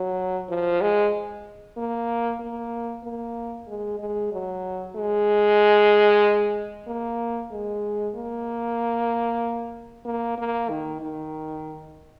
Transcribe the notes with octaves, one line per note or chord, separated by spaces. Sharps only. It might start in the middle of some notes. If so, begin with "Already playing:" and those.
Already playing: F#3
F3
G#3
A#3
A#3
A#3
G#3
G#3
F#3
G#3
A#3
G#3
A#3
A#3
A#3
D#3
D#3